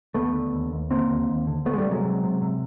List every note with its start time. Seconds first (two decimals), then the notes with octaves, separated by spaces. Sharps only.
0.14 D#2 A3 B3
0.34 D3
0.53 D#2
0.72 D#2
0.91 D3 A#3 C4
1.10 D#2
1.29 D#2
1.47 D3
1.65 D2 A3 B3
1.73 G#3
1.78 G3 A3
1.85 C3
1.92 F#3 G#3
2.05 C3
2.23 C3
2.42 C3